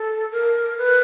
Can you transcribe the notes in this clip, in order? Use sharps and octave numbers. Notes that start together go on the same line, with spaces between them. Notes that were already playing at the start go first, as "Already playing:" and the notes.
Already playing: A4
A#4
B4